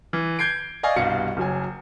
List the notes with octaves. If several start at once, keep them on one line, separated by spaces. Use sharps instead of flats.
E3
G6 G#6 C7 D7
D5 D#5 F5 G#5 C#6
C2 G2 B2 F5 C#7
F#1 F#3 G#5